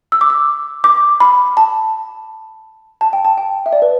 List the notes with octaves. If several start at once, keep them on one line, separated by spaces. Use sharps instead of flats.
E6
D6
E6
D6
B5
A5
A5
G5
A5
G5
E5
D5
B4